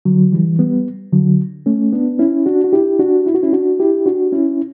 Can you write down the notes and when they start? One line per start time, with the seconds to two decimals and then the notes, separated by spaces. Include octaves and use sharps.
0.05 D3 F#3
0.32 E3 G3
0.59 G3 B3
1.12 D3 F#3
1.66 A3 C#4
1.92 B3 D4
2.19 C#4 E4
2.46 D4 F#4
2.64 F#4
2.72 E4 G4
2.99 D4 F#4
3.26 E4
3.35 F#4
3.43 C#4 E4
3.53 D4 F#4
3.79 E4 G4
4.06 D4 F#4
4.32 C#4 E4